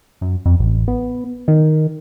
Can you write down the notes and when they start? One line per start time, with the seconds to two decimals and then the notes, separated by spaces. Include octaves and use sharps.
0.21 F#2
0.46 F2
0.60 A1
0.88 B3
1.48 D#3